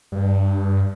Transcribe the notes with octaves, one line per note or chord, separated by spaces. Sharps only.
G2